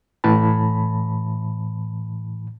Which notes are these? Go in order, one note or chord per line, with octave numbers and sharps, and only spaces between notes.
A2 E3 A5 B5